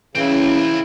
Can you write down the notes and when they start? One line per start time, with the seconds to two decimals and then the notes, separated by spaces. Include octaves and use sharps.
0.15 C#3 E3 C4 E4